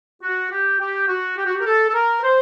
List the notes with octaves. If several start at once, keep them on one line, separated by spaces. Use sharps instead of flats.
F#4
G4
G4
F#4
G4
F#4
G4
A#4
A4
A4
A#4
B4
C5